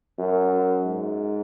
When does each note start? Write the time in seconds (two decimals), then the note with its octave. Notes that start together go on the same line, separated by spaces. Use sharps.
0.19 F#2
0.85 G#2